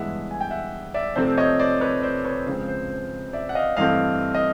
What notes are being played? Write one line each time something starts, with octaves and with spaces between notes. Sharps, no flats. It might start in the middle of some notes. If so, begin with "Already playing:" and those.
Already playing: G2 E3 G#3 B3 E5 F#5
G#5
G5
E5 F#5
D5 E5
C3 F3 A3 C4 C5 D5
C#5 D#5
C5 D5
B4 C#5
C5 D5
B4 C#5
C#3 F3 G#3 C4 C5
C5
C5
D5 E5
F#5
D#5 F5
G2 E3 A3 C4 D#5 F5
D#5